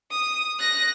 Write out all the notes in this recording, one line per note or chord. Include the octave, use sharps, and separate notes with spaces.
D#6
F#6 A#6